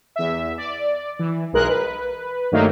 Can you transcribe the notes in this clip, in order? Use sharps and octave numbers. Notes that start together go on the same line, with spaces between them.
E2 E5
D5
E3
B1 G#3 A#4 F#6
B4
G2 D#3 F#3 A3 A#3 D#4